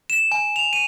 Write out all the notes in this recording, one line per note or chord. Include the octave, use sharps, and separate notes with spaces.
E7
G#5
F7
D#7